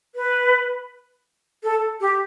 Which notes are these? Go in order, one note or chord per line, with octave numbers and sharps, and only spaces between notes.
B4
A4
G4